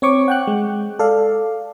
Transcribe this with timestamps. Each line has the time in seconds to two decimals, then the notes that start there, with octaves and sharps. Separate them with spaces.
0.02 C4 C#5 C#6 D6
0.28 F#5 G5 F#6
0.48 G#3
0.99 A4 D5 F5